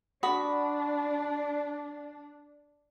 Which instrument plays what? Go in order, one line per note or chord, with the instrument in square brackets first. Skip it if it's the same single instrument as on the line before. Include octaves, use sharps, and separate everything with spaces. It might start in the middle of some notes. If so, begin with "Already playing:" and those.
[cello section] D4 [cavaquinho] F#4 B5 D#6